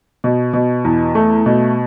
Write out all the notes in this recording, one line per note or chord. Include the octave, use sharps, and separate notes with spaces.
B2
B2
E2
A3
B2